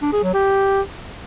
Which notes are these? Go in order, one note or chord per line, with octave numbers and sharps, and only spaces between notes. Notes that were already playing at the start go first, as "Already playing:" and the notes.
D4
G#4
F#3
G4